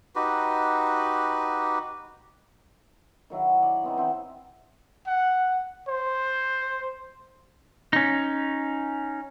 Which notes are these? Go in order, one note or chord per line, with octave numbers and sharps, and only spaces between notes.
D#4 F#4 G4 B4
D#3 F#3 E4
G#5
D5
B3 C4 D#4
E3 C4 D#4 E4
F#5
C5
C#4 D#4